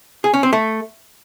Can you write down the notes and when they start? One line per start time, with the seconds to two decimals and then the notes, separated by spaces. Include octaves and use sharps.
0.24 G#4
0.34 C#4
0.43 C4
0.53 A3